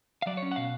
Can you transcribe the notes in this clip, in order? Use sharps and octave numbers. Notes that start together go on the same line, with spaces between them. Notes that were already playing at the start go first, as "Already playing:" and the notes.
F5
F#3 D5
C#5
C#4
F#5
B2 F5